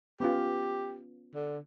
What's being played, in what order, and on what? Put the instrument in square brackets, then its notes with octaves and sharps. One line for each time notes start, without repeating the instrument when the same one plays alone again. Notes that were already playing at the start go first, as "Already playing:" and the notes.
[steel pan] B3 C#4 F4 [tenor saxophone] G4
[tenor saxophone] D3